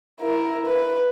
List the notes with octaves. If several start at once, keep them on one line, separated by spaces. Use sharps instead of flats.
E4 A#4
B4